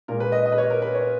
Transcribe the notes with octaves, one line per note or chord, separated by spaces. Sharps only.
A#2 G#3 A#4
B4
D#5
D#5
B4
C#5
A#4
B4
C#5